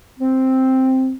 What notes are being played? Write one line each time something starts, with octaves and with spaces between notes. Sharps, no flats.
C4